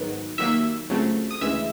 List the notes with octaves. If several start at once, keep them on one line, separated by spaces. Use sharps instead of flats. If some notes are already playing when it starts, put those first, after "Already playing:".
Already playing: G#2 D#3 F#3 B3
D#2 D#3 F#3 A#3 E5 E6
C#2 C#3 F#3 A3 C4
D#6
D2 C#3 E3 G#3 E5 E6